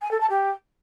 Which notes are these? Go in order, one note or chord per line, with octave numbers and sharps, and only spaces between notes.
G#5
A4
A5
G4